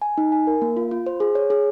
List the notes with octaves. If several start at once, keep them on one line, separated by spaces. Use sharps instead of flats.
G#5
D#4
G#5
A#4
A#3
F4
F4
C5
G#4
C#5
G#4